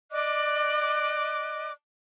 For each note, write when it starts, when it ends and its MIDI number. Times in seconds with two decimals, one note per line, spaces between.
0.11 1.71 74
0.11 1.71 75
0.11 1.71 86
0.11 1.71 90